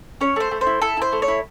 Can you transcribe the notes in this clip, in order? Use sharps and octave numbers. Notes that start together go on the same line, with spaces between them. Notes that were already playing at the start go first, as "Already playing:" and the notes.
C#4 C#5
A3 C5
A3
C5
E4
E4 A4
E4 C5
A3
C#5
E4